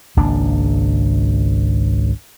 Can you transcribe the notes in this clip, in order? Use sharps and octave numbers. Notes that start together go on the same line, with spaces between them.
G#1 C#2 A#3 D4